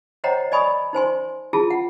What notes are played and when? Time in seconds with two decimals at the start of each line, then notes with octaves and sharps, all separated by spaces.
0.24 C5 C#5 D#5 F#5 G5 A#5
0.52 D5 D#5 G#5 B5 C#6 D#6
0.93 D#4 C5 G#5 C6
1.53 E4 F4 G#4 A5
1.71 F#5